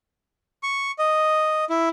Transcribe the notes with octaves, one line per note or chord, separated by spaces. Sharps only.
C#6
D#5
E4